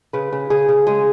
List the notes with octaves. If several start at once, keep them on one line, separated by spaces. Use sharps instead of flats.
C#3 B4
C#3
C#3 G#4
C#3
G#3 G#4